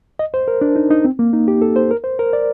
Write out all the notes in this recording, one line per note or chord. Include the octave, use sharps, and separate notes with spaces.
D#5
C5
A#4
D4
D#4
D#4
C4
A#3
D#4
G4
A4
C5
A#4
C5
A#4
D5